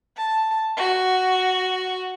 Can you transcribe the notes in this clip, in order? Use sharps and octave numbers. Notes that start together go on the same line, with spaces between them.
A5
F#4